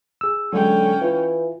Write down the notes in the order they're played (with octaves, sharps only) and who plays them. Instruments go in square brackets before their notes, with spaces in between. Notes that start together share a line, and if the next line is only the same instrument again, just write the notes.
[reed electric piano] G#4 E6
[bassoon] D3 [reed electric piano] F#3 G#3 [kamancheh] C#4 G5
[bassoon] E3 [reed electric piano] F4